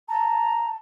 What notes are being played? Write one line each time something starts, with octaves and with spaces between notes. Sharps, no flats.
A5 A#5